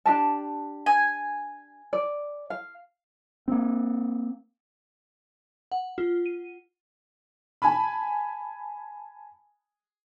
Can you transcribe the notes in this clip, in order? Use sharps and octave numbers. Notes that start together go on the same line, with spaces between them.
D4 G4 A5
G#5
D5
F5
A#3 C4
F#5
F4
D#7
G#5 A5 B5